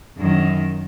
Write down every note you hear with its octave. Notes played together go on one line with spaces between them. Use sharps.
F#2 D#3